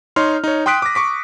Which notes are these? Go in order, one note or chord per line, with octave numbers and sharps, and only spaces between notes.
D#4 C#5 C6 F6
D#4 C#5
G5 C6 D#6 F#6 B6 D7
D6 A#6
C#6 D6 B6